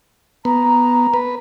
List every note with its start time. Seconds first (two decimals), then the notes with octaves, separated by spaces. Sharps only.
0.45 B3 A#5
1.14 B4